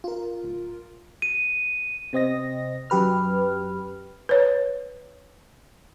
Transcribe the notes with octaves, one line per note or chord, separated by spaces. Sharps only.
F4 A#4
D1
D#7
C3 C4 D#5 A#6
F#2 G4 B4 F6
B4 C#5